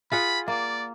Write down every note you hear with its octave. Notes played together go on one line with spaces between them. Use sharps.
F4 G#4 F#5 B5
A#3 D5